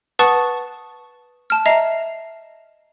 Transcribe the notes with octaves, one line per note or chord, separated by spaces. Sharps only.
B4 F#5 A5 C#6 D#6 A6
A5 F6
D#5 E5 A#5 C7